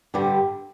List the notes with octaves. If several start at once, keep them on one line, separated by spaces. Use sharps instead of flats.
G2 D3 G3